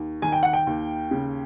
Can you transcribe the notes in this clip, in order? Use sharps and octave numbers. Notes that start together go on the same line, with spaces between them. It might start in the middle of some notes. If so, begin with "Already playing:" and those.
Already playing: D#2
D#3 G#5
G5
F#5
G5
D#2
C#3